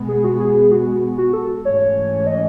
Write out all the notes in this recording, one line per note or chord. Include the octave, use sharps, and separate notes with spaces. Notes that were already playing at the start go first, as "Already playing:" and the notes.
Already playing: B2 G#3 B3
G#4
F#4
G#4
F#4
F#4
A4
G#2 E3 A3 C#4 C#5
D#5